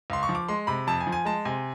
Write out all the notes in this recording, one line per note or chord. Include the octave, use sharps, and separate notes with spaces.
C#2 C6
C#6
F3
D6
G#3 C6
C3 B5
F2 A5
G#5
F3
G#5
G#3 A5
C3 G#5